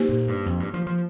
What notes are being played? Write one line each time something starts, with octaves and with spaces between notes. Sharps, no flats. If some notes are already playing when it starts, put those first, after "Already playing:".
Already playing: A#3 D#4 G4 C5
A#2
G2
F2
G2
F3
F3